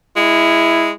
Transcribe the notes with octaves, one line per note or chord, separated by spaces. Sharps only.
G#3 E4